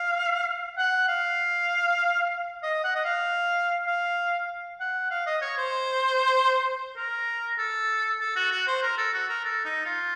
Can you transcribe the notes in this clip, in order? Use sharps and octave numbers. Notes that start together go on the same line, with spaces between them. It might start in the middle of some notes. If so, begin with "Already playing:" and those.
Already playing: F5
F#5
F5
D#5
F#5
D#5
F5
F5
F#5
F5
D#5
C#5
C5
A#4
A4
A4
F#4
F#4
C5
A#4
A4
F#4
A#4
A4
D#4
F4